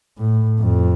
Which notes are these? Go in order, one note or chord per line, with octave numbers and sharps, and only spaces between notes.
A2
F2